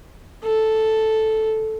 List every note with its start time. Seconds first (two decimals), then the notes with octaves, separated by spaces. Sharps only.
0.44 A4